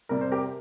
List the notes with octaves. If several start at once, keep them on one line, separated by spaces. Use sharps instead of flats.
C3 G3 A#4
C5
G4 A#4